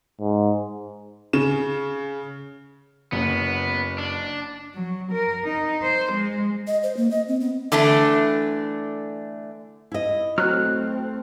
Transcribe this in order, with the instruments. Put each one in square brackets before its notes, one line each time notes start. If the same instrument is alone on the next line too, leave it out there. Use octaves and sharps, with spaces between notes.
[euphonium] G#2
[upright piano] C#3 E7
[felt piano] F#1 C#4 [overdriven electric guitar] B3
[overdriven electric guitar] D4
[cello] F#3
A#4
D#4
C5
G#3
[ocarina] D#5
C5
A#3
D#5
C4
B3
[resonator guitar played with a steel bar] D3 E3 A3 D4
[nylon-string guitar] E4 D#5
[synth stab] F#3 [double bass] A3 C4 [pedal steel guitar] F6 F#6